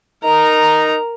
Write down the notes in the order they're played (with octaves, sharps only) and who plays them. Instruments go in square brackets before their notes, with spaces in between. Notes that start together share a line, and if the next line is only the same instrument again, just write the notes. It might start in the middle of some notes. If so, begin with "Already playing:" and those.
[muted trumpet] D#4 [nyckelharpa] A#4 A#5